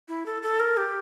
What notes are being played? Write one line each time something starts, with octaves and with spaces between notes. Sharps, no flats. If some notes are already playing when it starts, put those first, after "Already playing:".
E4
A4
A4
A#4
G4